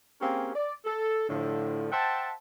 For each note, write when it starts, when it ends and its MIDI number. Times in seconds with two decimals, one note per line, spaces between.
0.21 0.53 58
0.21 0.53 60
0.21 0.53 61
0.21 0.53 67
0.21 0.53 68
0.21 0.53 70
0.55 0.74 74
0.85 1.26 69
1.29 1.88 45
1.29 1.88 50
1.29 1.88 53
1.92 2.32 72
1.92 2.32 76
1.92 2.32 78
1.92 2.32 79
1.92 2.32 81